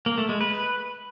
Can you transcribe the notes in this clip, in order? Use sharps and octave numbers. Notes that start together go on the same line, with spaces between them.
A#3
A3
G#3
B4